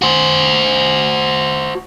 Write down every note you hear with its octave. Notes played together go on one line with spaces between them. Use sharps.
F#4 C5